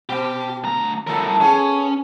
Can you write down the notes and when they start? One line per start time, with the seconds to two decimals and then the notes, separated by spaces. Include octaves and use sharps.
0.09 B2 G4
0.64 D2 A#5
1.07 F3 E4 A4 A#4
1.41 B3 C#4 G#4 A4